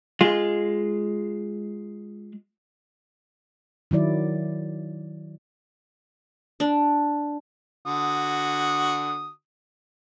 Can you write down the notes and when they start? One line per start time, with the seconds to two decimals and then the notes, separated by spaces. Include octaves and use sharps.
0.21 G#3 F4
3.91 D#3 F#3 E4 D5
6.60 D4
7.86 D3 F#4 D#6